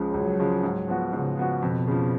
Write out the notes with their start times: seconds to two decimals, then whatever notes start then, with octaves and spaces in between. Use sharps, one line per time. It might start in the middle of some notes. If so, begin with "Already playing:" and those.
Already playing: C#2 C#3 F3 G#3
0.14 C#2 F#3
0.39 C#3 F3 G#3
0.63 G#2
0.88 F3 B3 F#4
1.13 G#2 C#3
1.37 F3 B3 F#4
1.62 F2 B2
1.87 C#3 F3